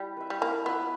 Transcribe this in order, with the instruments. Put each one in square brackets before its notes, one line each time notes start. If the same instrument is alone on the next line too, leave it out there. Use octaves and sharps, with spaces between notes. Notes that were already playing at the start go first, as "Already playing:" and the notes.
Already playing: [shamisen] G3 [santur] E4
[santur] B4 E5
[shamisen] G3
[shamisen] A#3 [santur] E4
[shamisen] B3 [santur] B4 E5